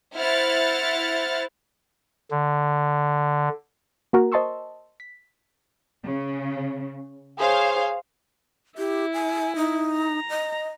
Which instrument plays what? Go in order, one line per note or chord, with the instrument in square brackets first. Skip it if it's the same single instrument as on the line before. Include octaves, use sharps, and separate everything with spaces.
[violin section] E4 C5 F#5 F6 A6
[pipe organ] D3
[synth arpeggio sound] A#3 F#4 A#4
C5 D#5 A5 C6 C#6 E6
B6
[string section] C#3
[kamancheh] G#4 C#5 [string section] C5 F5
[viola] E4 [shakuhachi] G4
[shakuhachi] G#5
D#4
[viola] A#5
[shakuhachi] D#5